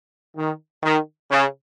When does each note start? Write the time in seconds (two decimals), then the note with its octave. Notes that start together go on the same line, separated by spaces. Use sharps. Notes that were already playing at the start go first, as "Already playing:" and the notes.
0.36 D#3
0.83 D#3
1.30 C#3